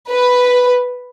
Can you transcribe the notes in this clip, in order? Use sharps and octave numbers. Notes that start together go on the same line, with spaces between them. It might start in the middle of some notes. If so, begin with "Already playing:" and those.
B4